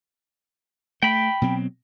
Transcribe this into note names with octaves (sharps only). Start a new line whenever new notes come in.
A3 G5 B5
B2 F#3 C4